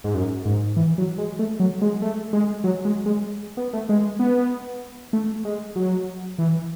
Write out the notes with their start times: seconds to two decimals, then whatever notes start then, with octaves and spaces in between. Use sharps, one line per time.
0.04 G#2
0.15 F#2
0.45 G#2
0.77 E3
0.98 F#3
1.18 G#3
1.39 A3
1.60 F#3
1.82 G#3
2.02 A3
2.33 G#3
2.64 F#3
2.85 G#3
3.06 G#3
3.57 B3
3.73 A3
3.89 G#3
4.19 B3
5.13 A3
5.45 G#3
5.76 F#3
6.38 E3